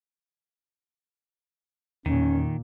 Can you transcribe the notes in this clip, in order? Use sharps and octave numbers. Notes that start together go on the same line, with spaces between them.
E2 A#2 D#3 C#4